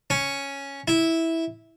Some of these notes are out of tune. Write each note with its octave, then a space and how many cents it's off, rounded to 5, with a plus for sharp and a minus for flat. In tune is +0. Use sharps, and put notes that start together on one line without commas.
C#4 +0
E4 -10